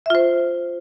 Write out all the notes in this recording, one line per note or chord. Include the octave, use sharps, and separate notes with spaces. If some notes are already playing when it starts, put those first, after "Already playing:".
F4 C5 E5